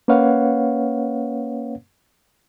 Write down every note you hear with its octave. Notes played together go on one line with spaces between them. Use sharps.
A#3 C#4 B4 C#5 F5 F#5